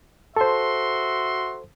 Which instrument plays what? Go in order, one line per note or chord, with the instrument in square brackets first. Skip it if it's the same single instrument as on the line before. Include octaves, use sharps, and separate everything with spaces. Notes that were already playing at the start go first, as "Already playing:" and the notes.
[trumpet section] F#4 E5 C6 [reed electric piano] A4 C5